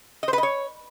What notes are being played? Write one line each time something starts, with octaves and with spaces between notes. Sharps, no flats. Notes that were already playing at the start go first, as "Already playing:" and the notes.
D#5
C5
B4
D#5
C#5